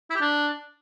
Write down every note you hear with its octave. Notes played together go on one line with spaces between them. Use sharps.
E4
G4
D4